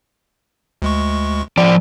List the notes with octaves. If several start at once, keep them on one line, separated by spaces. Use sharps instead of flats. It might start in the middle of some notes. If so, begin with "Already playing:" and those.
D2 G#3 C#6
F3 D5